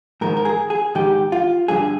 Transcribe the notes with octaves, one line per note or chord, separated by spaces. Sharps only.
G#2 D#3 A#4
A#4
G#4
G#4
G#2 D#3 G4
F4
G2 D3 G#4